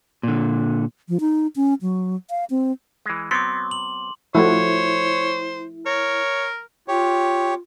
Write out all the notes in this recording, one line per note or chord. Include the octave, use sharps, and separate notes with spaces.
A#2 D3
F3
D#4
C#4
F#3
F5
C4
E3 G#3
F#3 B3 C4 C6 D6
F#7
F3 A3 E4 F#4 C5 C#5
A#4 C#5
F4 G4 C#5